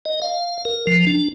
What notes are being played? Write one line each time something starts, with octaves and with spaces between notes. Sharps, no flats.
D#5
F5
A#4
F3
D4